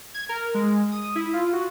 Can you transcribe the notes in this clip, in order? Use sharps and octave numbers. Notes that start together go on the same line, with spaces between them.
G#6
A#4
G#3
D#6
E4
F4
F#4